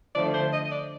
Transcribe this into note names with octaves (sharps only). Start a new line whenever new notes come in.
D3 F3 A3 D5
C5
D#5
D5